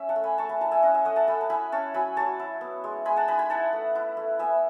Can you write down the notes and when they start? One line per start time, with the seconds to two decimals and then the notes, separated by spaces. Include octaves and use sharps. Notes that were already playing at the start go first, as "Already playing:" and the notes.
Already playing: C#4 E5
0.09 F#5 A5
0.16 A3
0.24 G#5 B5
0.38 A3 A5 C#6
0.49 G#5 B5
0.61 E4 F#5 A5
0.71 E5 G#5
0.82 C#4 D#5 F#5
0.94 E5 G#5
1.05 A3 D#5 F#5
1.16 F#5 A5
1.27 A3 G#5 B5
1.41 A5
1.50 E4 G#5 B5
1.72 C#4 A5 C#6
1.94 F#3 G#5 B5
2.16 F#3 A5 C#6
2.39 E4
2.61 B3
2.84 G#3
3.05 G#3 G#5 B5
3.16 F#5 A5
3.28 D#4 G#5 B5
3.39 G#5 B5
3.50 E4 F#5 A5
3.73 A3
3.95 E4
4.17 A3
4.39 B3 E5 G#5